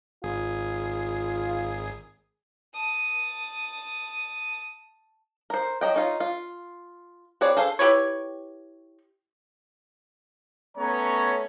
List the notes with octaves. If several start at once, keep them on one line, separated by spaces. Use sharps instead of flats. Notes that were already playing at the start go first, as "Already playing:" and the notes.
G#1 F4 G#4
A5 D#6
A#4 C5
F#3 D#5 G5
C#4 D#4 F4
F4
C4 G#4 B4 C#5 D5
G#4 A4 C5 F5
E4 G4 B4 C#5
A3 B3 C#4 C#5 A#5